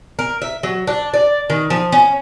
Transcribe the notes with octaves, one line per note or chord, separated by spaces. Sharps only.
A#4
E5
F#3
D4
D5
D#3
F3
C#4